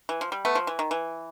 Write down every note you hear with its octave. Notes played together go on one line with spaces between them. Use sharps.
E3
F3
G3
A3 B3
F3
E3
D#3
E3